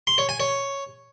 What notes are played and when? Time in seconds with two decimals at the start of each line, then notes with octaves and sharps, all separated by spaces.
0.07 C6
0.18 C#5
0.29 G#5
0.40 C#5